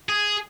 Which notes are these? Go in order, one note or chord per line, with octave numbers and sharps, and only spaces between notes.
G#4